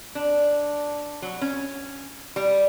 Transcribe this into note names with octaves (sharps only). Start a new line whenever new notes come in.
D4
F#3
C#4
G3